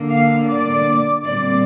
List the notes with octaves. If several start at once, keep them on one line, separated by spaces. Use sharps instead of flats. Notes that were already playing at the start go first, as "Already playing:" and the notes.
Already playing: D3 A#3
F5
D5
A#2 G3 C4 D5